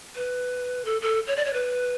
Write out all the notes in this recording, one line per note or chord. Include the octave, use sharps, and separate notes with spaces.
B4
A4
A4
C#5
D5
C#5
B4